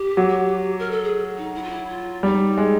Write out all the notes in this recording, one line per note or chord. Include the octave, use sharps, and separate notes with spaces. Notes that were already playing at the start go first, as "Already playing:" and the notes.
Already playing: G4
F#3
A#4
A4
G#4
D#4
E4
F4
E4
F4
G3 D#4
G#3